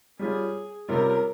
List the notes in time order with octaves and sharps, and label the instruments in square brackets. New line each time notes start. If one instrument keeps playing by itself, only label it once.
[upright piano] G3 C#4 F4 [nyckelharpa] G#4
[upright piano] C3 G3 C#4 F4 [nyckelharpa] A#4